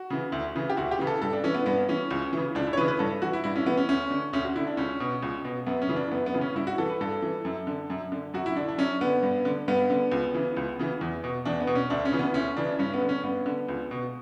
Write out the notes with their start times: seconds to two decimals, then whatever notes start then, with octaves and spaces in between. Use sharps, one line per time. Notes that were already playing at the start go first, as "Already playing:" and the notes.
Already playing: F#4
0.10 C#3 E3
0.32 D2
0.55 C#3 E3
0.70 G4
0.77 D2 F#4
0.91 G4
0.99 C#3 E3
1.07 A4
1.22 G2 A4
1.33 D4
1.44 E3 C#4
1.54 B3
1.66 G2 B3
1.89 E3 C#4
2.11 C#2
2.33 C#3 E3
2.55 C#2 D4
2.67 E4
2.73 C#5
2.77 C#3 E3 B4
2.88 B4
2.99 G2 A4
3.22 E3 F#4
3.33 E4
3.44 G2 E4
3.56 C#4
3.66 E3 B3
3.77 C#4
3.89 D2 C#4
4.10 D3
4.33 D2 C#4
4.44 F#4
4.56 D3 E4
4.67 D4
4.77 C#2 C#4
5.00 B2
5.23 C#2
5.45 B2
5.67 F#2 B3
5.82 C#4
5.89 C#3 E3
5.96 D4
6.11 F#2 B3
6.26 B3
6.34 C#3 E3
6.41 C#4
6.55 G2 E4
6.67 F#4
6.78 E3 A4
6.90 B4
7.01 G2 A4
7.22 E3
7.45 F#2
7.67 D3
7.90 F#2
8.12 D3
8.34 F#2 F#4
8.46 E4
8.56 D3 D4
8.68 D4
8.78 F#2 C#4
9.01 D3 B3
9.23 G2
9.45 D3
9.68 G2 B3
9.90 D3
10.12 C#2
10.34 C#3 E3
10.57 C#2
10.79 C#3 E3
11.01 E2
11.24 B2
11.45 E2 D4
11.60 B3
11.67 B2
11.75 C#4
11.90 D2 D4
12.05 C#4
12.12 C#3 E3
12.19 B3
12.34 D2 C#4
12.57 C#3 E3 D4
12.79 G2 C#4
12.94 B3
13.02 D3
13.09 C#4
13.23 G2 B3
13.46 D3
13.68 C#2
13.91 B2